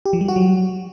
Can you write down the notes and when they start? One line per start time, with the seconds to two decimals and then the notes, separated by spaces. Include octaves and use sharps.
0.06 G4
0.13 F3
0.21 G3
0.28 F#4
0.36 F#3